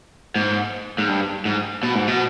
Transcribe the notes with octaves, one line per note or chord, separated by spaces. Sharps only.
G#2
G#2
G2
G#2
B2
G#2
B2